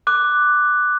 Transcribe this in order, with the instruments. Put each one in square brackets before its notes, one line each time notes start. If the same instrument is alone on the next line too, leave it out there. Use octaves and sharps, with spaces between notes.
[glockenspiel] D6 F#6